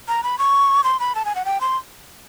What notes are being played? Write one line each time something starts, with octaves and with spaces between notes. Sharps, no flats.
A#5
B5
C#6
C6
B5
A5
G#5
F#5
G5
C6